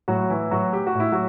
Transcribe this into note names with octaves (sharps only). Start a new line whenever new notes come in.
A2 F#3 F#4
E3 E4
A2 F#3 F#4
G4
F#4
A2 E4
F#3 F#4